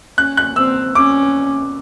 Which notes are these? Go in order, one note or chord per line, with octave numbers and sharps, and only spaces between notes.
C#4 F#6
F#6
C4 E6
C#4 D6